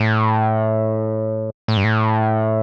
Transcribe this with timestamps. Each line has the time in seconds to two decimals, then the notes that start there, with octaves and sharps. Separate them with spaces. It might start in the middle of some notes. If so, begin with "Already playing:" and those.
Already playing: A2
1.68 A2
1.77 G2
1.84 A2